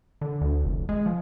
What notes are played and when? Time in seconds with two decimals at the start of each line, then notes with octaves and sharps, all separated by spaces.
0.21 D3
0.41 D2
0.65 F1
0.89 G#3
1.06 F3